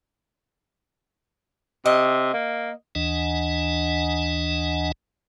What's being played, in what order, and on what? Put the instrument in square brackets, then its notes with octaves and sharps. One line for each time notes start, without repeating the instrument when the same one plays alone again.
[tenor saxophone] C3 [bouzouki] D#5
[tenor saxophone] A#3
[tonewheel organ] D#2 E3 D4 D#5 F#5 G#5